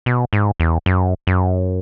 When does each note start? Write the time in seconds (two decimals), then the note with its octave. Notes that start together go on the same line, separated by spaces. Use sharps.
0.06 B2
0.33 G#2
0.60 E2
0.86 F#2
1.27 F#2